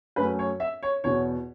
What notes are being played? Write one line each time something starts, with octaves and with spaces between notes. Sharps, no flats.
F#2 F#3 A3 C#4 B4
C#5
E5
C#5
E2 B2 B3 C#5